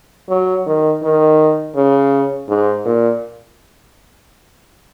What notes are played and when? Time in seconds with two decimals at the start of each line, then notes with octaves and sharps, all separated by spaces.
0.29 F#3
0.66 D#3
1.03 D#3
1.76 C#3
2.49 G#2
2.85 A#2